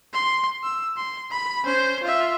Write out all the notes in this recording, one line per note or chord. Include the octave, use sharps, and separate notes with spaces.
C6
E6
C6
B5
C#4 C5
F4 E5